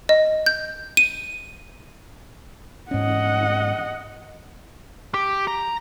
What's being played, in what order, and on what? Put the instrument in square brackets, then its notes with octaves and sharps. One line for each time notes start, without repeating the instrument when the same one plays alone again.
[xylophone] D#5
G6
D#7
[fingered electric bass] G#2 C#4 [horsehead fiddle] D#5 F#5
[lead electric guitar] G4
A#5